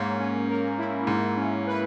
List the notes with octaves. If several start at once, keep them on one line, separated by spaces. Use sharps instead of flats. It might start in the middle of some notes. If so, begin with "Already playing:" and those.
Already playing: G#2 A#3 C#4
C#4
A#4
E4
G#2 A#3
C#4
B4